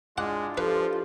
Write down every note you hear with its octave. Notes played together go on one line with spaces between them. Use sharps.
G#3 D4 E4 F4 F#5 D6
F3 G4 A4 B4